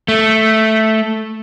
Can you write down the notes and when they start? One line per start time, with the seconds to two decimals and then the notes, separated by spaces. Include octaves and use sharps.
0.08 A3